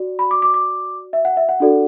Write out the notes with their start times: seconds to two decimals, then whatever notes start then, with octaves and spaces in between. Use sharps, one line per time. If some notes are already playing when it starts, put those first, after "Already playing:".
Already playing: F#4 D5
0.19 B5
0.31 D6
0.42 D6
0.54 D6
1.13 E5
1.25 F#5
1.37 E5
1.49 F#5
1.60 D4 F#4 A4 D5